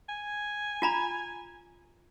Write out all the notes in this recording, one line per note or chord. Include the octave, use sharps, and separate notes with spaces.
G#5
F4 A#5 B5